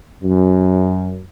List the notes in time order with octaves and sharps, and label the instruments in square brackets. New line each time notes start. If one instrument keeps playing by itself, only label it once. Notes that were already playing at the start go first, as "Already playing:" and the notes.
[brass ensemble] F#2